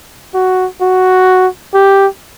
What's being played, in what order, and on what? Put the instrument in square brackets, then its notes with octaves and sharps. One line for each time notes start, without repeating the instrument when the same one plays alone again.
[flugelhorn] F#4
F#4
G4